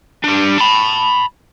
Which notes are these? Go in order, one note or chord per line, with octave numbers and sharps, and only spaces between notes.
G3 D4
A5 B5